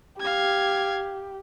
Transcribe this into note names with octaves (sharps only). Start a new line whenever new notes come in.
G4 F5 G#6